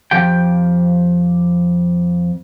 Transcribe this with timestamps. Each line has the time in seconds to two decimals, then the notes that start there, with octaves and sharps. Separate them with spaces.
0.11 F2 F3 G4 G5